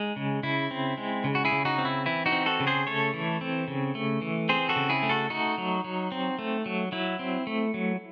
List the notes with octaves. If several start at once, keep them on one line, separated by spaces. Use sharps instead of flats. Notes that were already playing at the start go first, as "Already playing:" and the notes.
Already playing: G#3 D#4
C#3
C#3 E4
C4
G#3
C#3
F#4
E4 G#4
C#3
D#4 F#4
C4
E4
E3 E4
D#4 F#4
C4
F#4 A4
C#3
G#4 C5
A3 A4 C#5
E3
C4
C#3
A3
E3
C4 G#4 C5
F#4 A4
C#3
E4 G#4
A3
F#4 A4
A3 D#4 F#4
F#3
F#3
C4
A3
F#3
F#3 E4
C4
A3
F#3